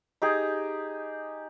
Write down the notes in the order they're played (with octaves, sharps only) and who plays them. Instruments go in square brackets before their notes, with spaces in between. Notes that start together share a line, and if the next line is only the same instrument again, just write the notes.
[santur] D#4 G4 G#4